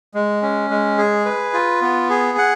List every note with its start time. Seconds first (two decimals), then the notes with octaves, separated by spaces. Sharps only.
0.14 G#3
0.42 C#4
0.70 G#3
0.98 G#4
1.25 B4
1.54 F4
1.82 B3
2.09 G#4
2.38 F#5